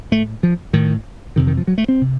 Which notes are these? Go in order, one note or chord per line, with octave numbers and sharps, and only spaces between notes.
A2 A3
F3
A2 D#3
F2 C3 D#3
D#3
F3
F#3
A3
C4
C3